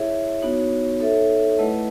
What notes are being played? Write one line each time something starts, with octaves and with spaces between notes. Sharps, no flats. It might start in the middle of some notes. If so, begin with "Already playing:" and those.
Already playing: E4 G#4 C#5 E5
B3 D#4 F#4 C#5
D#4 A4 C#5 E5
A3 E4 B4 D#5 F#5